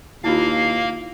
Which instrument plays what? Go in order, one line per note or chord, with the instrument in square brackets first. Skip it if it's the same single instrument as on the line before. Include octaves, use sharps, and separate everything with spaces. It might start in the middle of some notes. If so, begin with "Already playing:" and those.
[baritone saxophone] D#2 [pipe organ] A#3 F5 [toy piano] E4 F4